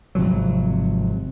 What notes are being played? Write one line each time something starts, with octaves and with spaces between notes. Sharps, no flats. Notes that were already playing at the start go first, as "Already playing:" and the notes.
G#1 C3 F3 F#3